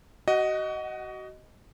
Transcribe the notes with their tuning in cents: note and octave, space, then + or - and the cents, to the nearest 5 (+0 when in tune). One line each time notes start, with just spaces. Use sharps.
F#4 +30 D#5 +0 F#5 +0